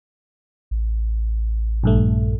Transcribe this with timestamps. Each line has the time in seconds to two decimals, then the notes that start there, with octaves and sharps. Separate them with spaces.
0.71 A1
1.84 A#1 G2 A3